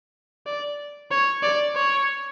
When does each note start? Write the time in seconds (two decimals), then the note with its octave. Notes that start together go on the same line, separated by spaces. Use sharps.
0.47 D5
1.11 C#5
1.43 D5
1.76 C#5